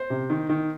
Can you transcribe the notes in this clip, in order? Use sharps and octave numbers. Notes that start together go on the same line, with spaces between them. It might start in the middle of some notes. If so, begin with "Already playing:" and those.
Already playing: C5
C3
D#3
D#3